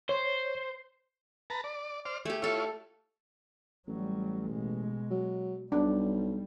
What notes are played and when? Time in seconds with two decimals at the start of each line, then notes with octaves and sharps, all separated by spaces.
0.09 C5 C#5
1.50 B4 A5 A#5
1.64 D5
2.05 C5 D5 F6
2.25 A3 G4 G#4
2.42 E4 F4 A4 C#5 F5
3.88 A1 F#3 G3
4.50 B2 G#3
5.11 F#3
5.72 B1 G3 D4